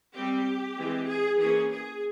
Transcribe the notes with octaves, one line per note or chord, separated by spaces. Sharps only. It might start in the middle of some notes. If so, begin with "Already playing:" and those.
G3 C4 G4
E3 G#3 C4
G#4
E3 A#3 C#4 G#4
G#4